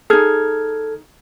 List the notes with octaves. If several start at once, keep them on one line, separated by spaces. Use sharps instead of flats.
D#4 G#4 A4 F6 G#6